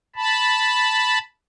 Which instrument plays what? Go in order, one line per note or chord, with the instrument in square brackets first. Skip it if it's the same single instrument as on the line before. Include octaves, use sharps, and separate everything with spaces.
[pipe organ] A5 B5